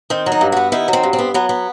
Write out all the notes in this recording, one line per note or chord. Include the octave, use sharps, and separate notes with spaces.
D#3 C4
F#3
D#4
G2
B3 F#4
D#3 E4
F#3
C4
G2
C4
B3
F#3 B3
B3